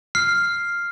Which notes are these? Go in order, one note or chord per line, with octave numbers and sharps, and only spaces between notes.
F6 C7